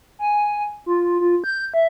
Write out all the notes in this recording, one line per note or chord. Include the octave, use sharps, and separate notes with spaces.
G#5
F4
F4
G6
E5